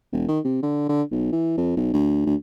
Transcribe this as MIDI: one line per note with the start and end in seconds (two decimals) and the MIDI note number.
0.12 0.27 28
0.28 0.39 51
0.44 0.62 48
0.62 0.87 50
0.89 1.02 50
1.11 1.30 35
1.32 1.57 52
1.57 1.76 41
1.76 1.93 35
1.93 2.24 38
2.26 2.35 38